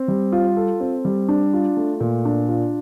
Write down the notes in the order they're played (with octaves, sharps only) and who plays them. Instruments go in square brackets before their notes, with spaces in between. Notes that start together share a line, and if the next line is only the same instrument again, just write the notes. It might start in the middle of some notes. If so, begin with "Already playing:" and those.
Already playing: [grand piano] C4
G3
F4
A4
C4
G3
D4
F4
A3
A#2
D4
F4